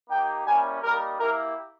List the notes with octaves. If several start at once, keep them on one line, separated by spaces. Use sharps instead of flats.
A#3 D#4 G4 G5
G3 A#3 C#4 E4 G#5
G3 A#3 D#4 A#4
A#3 E4 G4 A#4